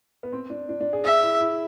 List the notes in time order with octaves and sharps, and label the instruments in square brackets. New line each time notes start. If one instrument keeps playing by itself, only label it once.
[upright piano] B3
C4
D4
D4
D4
G#4
[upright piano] G#4 [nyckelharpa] E5
[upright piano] E4
E4